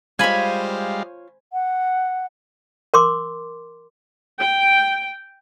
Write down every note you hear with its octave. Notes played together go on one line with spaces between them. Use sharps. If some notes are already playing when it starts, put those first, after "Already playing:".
G3 G#3 F4 C5 C#5 F5 G#5 B5
F#5
A#4 C6 D6
G5